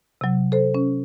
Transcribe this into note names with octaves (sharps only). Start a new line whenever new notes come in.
C3 F#3
A4 C5
C#4